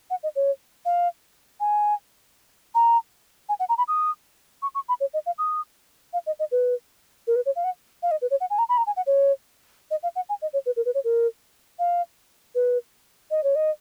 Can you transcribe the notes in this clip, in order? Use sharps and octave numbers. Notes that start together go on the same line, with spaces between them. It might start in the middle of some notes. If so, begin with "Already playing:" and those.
F#5
D#5
C#5
F5
G#5
A#5
G#5
F#5
A#5
B5
D#6
C#6
C#6
B5
C#5
D#5
F5
D#6
F5
D#5
D#5
B4
A#4
B4
C#5
F5
F#5
F5
D#5
B4
C#5
F#5
G#5
A#5
B5
A#5
G#5
F#5
C#5
D#5
F5
F#5
G#5
D#5
C#5
B4
A#4
B4
C#5
A#4
F5
B4
D#5
C#5
D#5